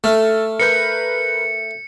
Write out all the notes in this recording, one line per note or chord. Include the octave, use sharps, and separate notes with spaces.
A3 A4 F6
A#4 B4 G6 C#7